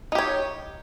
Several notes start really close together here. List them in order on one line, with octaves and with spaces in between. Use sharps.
D#4 G4 C#5